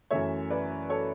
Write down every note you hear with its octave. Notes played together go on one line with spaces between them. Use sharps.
F#2 E3 A3 C#5 E5
B4 D5
A4 C#5